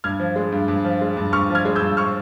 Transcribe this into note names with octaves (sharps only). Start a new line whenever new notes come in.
G2 F6 G#6
F3
G#3
G2
G2
F3
G#3
G2
G2 C#6 F6
F3
F6 G#6
G#3
E6 G6
G2
C#6 F6